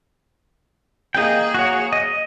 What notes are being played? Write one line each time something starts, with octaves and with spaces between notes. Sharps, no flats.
A#3 G#4 D#5 G5
F#4 C#5
D#5